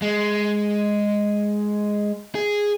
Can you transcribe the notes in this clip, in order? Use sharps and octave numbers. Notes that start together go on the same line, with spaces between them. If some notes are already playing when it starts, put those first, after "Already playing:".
G#3
G#4